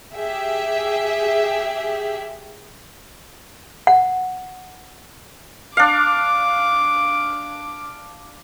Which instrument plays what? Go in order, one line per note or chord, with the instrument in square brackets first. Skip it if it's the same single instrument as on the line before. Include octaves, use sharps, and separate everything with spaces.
[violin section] G4 G#4 E5
[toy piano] F#5
[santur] D4 F5 [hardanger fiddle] D6